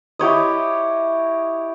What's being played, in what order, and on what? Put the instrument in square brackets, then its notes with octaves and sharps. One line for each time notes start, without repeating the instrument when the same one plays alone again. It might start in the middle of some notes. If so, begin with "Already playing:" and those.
[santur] E4 G4 C#5 D#5